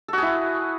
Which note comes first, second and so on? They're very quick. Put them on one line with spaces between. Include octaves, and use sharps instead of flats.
A4 F#4 G#4 E4